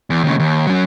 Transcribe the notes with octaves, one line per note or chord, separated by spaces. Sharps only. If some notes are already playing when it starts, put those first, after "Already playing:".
E2
D#2 C#3
D#2
F#3 C#4